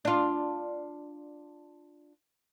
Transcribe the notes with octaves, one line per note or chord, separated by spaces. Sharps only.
D4 F4